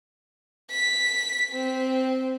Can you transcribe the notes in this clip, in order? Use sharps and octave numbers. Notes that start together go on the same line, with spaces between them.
B6
C4